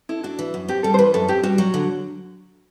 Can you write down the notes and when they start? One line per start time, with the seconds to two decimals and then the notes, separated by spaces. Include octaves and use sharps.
0.09 E4 A4
0.23 D4 F#4
0.39 E3
0.54 F#2
0.68 C4 G4
0.83 G3 A4
0.94 C5
0.99 E3 B4
1.14 F#2 A4
1.28 C4 G4
1.43 G3 F#4
1.58 F#3
1.74 D3